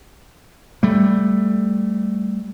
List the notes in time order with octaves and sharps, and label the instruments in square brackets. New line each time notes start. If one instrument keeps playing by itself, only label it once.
[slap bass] G3 A3